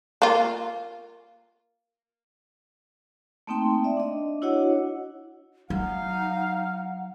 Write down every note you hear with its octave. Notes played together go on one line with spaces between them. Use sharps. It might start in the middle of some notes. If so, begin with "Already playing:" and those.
A#3 F4
A3 A#3 C4 D#4 G5 C6
D5 E5
D4 D#5
D4 E4 F#4 C#5 D#5 F#5
F#3 D#4 F5 F#5